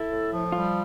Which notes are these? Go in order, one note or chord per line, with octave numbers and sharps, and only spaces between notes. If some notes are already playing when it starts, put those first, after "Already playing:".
Already playing: E4 A4
A2
F3
G3 F4